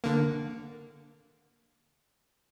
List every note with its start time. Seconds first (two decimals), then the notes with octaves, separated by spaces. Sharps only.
0.04 D3 A#3